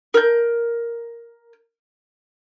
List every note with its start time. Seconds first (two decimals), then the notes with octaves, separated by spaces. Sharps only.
0.14 A#4 G6